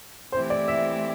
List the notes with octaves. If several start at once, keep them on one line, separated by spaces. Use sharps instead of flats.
E3 A3 C4 E4 G4 C5
D5
E5